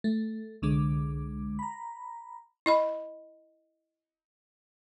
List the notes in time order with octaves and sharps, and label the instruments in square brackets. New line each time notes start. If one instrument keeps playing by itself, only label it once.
[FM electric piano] A3
C2 D3 G#3 D6
A#5 B5
[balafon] E4 D#5 B5